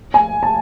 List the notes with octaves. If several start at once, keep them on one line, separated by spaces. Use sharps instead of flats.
G#5
A5